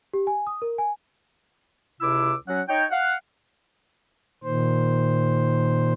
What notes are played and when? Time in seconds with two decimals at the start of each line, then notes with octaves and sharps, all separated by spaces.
0.14 G4
0.27 G#5
0.47 D#6
0.62 A#4
0.78 G#5
2.01 C#2 C3 E4 D6 E6
2.48 F#3 C#4 F#5
2.68 D#4 C#5 G5
2.91 F5 F#5
4.44 A#2 D#3 C5